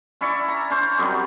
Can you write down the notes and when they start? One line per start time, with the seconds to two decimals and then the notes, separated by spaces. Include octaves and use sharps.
0.21 C#4 E4 D5 C#6
0.48 A#5
0.70 C#4 C5
0.98 F#2 C3 F#3 G3